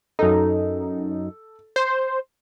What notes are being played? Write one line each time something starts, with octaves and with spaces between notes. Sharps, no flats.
F#2 D#4 A4
C5